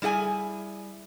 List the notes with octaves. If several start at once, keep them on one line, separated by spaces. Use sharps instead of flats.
G3 E4 G#4 F#5 G#5